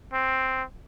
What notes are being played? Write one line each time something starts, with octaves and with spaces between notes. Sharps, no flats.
C4